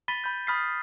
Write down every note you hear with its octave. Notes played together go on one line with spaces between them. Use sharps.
B5 A6 B6 D#7 G7
B5 G6
B5 D#6 F6 A6 B6 C7